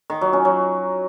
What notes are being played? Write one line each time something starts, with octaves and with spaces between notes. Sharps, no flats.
D#3
F#3
C#4
F#3